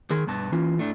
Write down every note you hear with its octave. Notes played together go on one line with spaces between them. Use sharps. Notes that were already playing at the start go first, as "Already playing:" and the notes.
D#3 G#4 A#4
G2 B2 B3 A5
E3 C#4 F4
A2 A3 D4